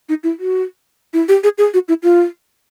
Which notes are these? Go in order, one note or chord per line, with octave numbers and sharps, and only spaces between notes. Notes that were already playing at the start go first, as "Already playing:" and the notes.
D#4
E4
F#4
E4
G4
G#4
G#4
F#4
E4
F4